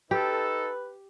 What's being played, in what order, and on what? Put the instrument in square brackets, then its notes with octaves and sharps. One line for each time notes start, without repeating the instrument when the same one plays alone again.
[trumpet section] D#4 A4 [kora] G4 [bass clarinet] B4